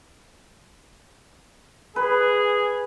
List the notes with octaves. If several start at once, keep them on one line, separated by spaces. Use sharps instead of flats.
G#4 B4